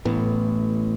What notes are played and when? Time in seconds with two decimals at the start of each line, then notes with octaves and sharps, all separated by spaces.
0.05 A1 A2 B3